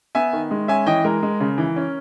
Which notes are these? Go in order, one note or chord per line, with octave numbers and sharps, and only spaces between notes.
B3 E5 G#5
D#3
G#3
C#4 E5 G#5
E3 D#5 G5
G#3 A#4
G#3
C#3
E3
C#4